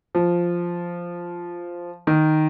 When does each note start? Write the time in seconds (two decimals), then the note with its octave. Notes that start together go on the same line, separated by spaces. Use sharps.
0.15 F3
2.07 D#3